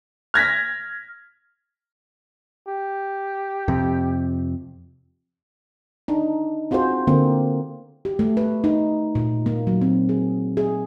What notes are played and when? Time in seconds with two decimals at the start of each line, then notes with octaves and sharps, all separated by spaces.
0.34 F6 G#6 A#6 B6
2.68 G4
3.68 F2 C3
6.08 D4 D#4
6.71 C4 F4 F#4 G#4 C5
7.07 D3 A#3 C4
8.05 G4
8.19 A3
8.37 B4
8.64 D#4
9.15 A#2
9.46 A#3
9.67 F#3
9.81 C4
10.09 G#4
10.57 G#4